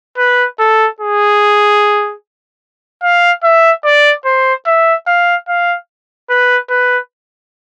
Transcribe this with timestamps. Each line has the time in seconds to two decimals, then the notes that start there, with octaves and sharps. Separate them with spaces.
0.18 B4
0.60 A4
1.01 G#4
3.03 F5
3.44 E5
3.85 D5
4.25 C5
4.67 E5
5.07 F5
5.48 F5
6.30 B4
6.70 B4